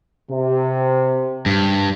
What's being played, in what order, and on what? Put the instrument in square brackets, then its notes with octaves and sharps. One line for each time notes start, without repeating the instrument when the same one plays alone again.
[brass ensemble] C3
[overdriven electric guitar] G2